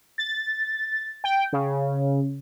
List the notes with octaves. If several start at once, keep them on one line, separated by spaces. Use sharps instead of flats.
A6
G5
C#3